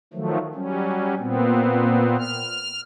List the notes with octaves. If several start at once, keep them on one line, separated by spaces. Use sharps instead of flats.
D#3 F3 F#3 A3
F#3 G3 C#4
A#2 B3 C4
F6